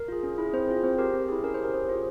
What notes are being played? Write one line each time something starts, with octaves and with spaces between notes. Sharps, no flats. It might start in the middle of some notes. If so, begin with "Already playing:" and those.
Already playing: A#4
F4 G#4
C#4
E4 G#4
C4 C5
F4 G#4
C4 C5
G4 A#4
C4
E4 G#4
C#4 A#4
C5
G4
A#4
C#4 C5
F4 G#4 C5